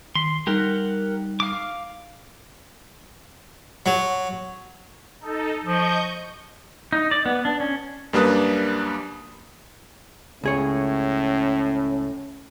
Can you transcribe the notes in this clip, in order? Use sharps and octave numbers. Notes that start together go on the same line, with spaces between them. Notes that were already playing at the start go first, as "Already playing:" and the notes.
D#3 C6 B6 C7
G3 D#4 G4 A#4 F#5
F5 D6
F#3
D#4 A4
F3 D#5 C#6 G6
D#4
D5
B3
D4
C#4
F#2 G3 A#3 D4 B4 D#6
C#2 A2 C#4 G#4 C#5